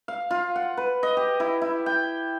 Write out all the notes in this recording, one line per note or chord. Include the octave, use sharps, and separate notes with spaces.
F5
F4
F#5
B4
D#5
G4
E4
E4
G5